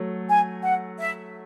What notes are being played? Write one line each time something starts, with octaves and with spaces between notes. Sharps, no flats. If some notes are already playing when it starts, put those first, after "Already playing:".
Already playing: F#3 A3
G#5
F#5
E5